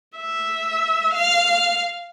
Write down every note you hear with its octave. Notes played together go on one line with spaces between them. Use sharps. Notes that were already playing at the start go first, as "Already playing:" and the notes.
E5
F5